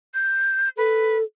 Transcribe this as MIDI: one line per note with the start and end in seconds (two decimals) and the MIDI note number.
0.14 0.69 91
0.78 1.23 69
0.78 1.17 71